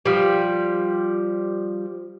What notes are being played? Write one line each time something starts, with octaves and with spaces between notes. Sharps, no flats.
F3 G3